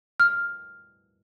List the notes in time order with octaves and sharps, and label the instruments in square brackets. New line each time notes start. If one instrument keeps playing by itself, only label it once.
[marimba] F6